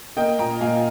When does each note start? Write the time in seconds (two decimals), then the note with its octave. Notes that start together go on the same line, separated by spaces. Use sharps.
0.17 A#3 D#5 G5
0.39 A#2 G5 A#5
0.61 A#2 F5 G#5